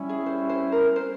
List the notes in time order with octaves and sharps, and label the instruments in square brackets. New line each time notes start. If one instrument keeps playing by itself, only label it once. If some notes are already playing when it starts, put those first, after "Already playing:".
Already playing: [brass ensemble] G3 C#4 E4
[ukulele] G#4
C5
C5
A#4
C5